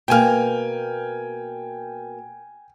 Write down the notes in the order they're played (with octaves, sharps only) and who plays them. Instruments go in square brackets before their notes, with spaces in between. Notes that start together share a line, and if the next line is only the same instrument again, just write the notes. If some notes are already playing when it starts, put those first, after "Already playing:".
[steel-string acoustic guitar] B2 A#3 [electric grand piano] G5 G#5 F6